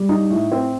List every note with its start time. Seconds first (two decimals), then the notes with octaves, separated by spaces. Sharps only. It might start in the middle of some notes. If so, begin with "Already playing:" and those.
Already playing: G3
0.09 D#4
0.30 A2
0.52 C4